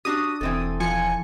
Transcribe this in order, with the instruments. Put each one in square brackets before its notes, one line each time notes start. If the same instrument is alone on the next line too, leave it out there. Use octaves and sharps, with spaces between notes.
[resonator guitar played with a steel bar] D4 F#4 G4 [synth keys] D#6
[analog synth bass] E1 [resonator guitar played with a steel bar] E3 C4 A4
[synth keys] F3 G#5 C#7